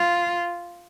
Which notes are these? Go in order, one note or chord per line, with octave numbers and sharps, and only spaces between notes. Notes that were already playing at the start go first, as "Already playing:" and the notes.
Already playing: F4